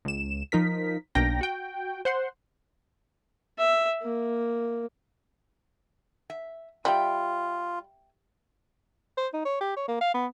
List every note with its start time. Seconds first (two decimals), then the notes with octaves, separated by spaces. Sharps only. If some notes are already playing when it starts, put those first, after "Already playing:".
0.05 C#2 E7
0.52 F3 D#4 A#4 B6
1.15 B1 A#3 D4 G5 A#5 A#6
1.41 F#4 G5
2.05 C5 F#5 C6
3.59 E5
4.03 A#3
6.30 E5
6.85 G3 F4 E5 G5
9.17 C5
9.33 D#4
9.45 C#5
9.61 G4
9.76 C#5
9.88 A#3
10.01 F5
10.14 B3